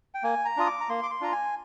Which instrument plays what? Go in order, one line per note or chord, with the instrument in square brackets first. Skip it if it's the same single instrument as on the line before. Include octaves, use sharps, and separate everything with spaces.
[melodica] G5
A#3 G#5
A#5
D4 F4 D#6
D6
A#5
A#3 C6
D6
C6
D4 F4 A#5
G#5